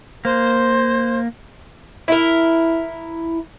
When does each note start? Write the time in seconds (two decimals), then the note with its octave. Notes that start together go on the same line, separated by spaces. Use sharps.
0.25 A#3 C5
2.08 E4 A#4